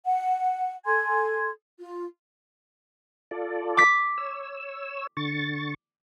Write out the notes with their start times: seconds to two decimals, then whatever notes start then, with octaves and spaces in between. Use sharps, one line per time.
0.06 F#5
0.86 A4 G#5 C6 G#6
1.78 F4
3.31 F4 A4 D5
3.77 D6 B6
4.18 C#5 E6
5.17 D3 C#6 A6